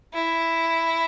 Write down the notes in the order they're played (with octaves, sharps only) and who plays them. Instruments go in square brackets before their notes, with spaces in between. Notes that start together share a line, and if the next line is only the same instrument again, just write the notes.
[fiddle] E4